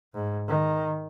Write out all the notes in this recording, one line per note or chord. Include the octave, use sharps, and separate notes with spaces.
G#2
D#3